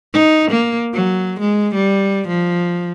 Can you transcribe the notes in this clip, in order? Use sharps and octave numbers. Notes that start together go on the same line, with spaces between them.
D#4
A#3
F#3
G#3
G3
F3